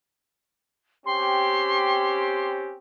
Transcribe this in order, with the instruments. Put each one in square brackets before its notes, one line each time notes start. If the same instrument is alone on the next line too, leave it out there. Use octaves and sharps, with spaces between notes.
[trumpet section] C4 C#4 G4 [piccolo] C6